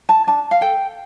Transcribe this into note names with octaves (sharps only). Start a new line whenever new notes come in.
A5
D4 A5
F5
A4 G5